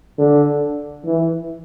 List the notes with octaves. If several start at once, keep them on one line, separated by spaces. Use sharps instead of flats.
D3
E3